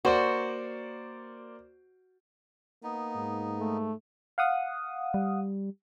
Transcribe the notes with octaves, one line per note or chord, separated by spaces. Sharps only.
A#3 F#4 C5 D5
A#3 B3 D#4
G#2
A3
F5 F#5 D#6
G3